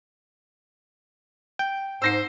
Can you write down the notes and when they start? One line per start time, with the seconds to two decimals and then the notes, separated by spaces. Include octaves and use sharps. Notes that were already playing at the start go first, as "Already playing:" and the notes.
1.59 G5
2.02 G#2 C5 E6 A#6 C7